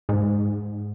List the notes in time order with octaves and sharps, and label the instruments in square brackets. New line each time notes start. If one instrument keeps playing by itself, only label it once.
[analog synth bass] G#2